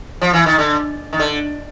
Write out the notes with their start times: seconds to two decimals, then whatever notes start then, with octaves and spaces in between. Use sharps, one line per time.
0.21 F3
0.33 E3
0.46 D#3
0.58 D3
1.13 D#3
1.20 D3